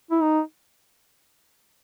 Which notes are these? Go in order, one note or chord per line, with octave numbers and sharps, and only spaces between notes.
E4
D#4